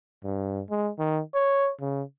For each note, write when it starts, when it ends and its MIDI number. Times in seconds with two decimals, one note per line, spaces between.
0.24 0.62 43
0.70 0.90 56
0.99 1.21 51
1.34 1.71 73
1.80 2.02 49